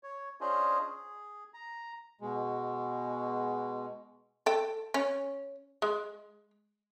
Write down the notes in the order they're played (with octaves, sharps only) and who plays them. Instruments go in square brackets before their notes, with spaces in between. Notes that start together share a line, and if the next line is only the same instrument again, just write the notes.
[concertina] C#5
C#4 D4 F4 G#4 C5 D#5
G#4
A#5
[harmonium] B2 G#3
[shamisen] A4 G5
C#4
G#3